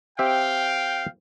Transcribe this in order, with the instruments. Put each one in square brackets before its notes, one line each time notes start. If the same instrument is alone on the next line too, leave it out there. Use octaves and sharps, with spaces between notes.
[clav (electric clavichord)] C4 G4 E5 [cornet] F5 [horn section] G5